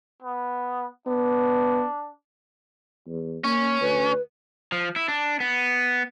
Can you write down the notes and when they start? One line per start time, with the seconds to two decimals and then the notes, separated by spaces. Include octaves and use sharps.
0.22 B3
1.07 B3 D4
3.07 E2
3.44 A#3 C#4
3.81 D2 B4
4.72 F3
4.96 E4
5.08 D4
5.40 B3